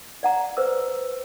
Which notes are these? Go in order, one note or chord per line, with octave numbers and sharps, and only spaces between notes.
D5 F#5 A#5
B4 C5 E6